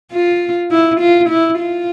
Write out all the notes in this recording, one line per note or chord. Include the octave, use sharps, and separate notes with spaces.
F4
E4
F4
E4
F4